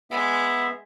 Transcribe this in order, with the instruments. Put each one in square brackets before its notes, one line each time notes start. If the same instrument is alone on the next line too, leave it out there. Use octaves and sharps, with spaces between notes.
[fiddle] G#3 [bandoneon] B3 E5